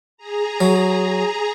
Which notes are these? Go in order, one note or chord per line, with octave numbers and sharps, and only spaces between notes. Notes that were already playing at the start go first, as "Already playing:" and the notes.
G#4 A#5
F#3